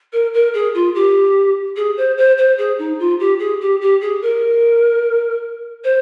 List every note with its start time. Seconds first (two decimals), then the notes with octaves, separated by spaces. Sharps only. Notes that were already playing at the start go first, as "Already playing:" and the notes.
0.12 A#4
0.33 A#4
0.53 G#4
0.74 F4
0.94 G4
1.76 G#4
1.97 C5
2.17 C5
2.38 C5
2.57 G#4
2.78 D#4
2.99 F4
3.19 G4
3.39 G#4
3.60 G4
3.81 G4
4.01 G#4
4.22 A#4
5.84 C5